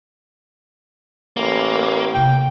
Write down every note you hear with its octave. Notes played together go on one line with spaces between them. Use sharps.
A1 A#3
C3 A#3 G5